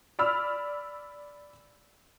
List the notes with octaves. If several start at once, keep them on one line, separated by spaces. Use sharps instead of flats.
D5 B5 E6 F6